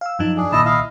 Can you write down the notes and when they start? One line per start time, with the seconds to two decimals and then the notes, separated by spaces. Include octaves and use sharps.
0.01 F5 E6
0.19 F#2 F3 D#4 A5
0.37 D4 G#4
0.52 C2 A#2 D#3 E4 D#5 A5
0.66 E4 D#5 F5